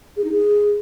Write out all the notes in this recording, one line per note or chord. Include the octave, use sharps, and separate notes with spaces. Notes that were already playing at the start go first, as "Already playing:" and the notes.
G#4
D#4
G#4